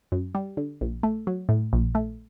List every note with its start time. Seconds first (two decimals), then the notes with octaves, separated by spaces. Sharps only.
0.12 F#2
0.35 G3
0.57 D3
0.81 A#1
1.03 A3
1.27 F#3
1.49 A2
1.73 A#1
1.95 A3